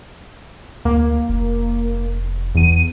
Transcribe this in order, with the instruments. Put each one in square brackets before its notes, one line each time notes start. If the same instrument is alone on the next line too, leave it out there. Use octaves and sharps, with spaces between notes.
[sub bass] D2 [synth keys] A#3
[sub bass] F1
[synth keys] E2 D#7